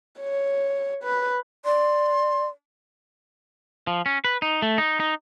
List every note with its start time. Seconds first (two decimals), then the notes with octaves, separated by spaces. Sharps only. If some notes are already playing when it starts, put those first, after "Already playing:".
0.20 C#5
1.03 B4
1.65 D5 C6
3.87 F3
4.06 C#4
4.24 B4
4.42 D#4
4.62 A3
4.78 D#4
5.00 D#4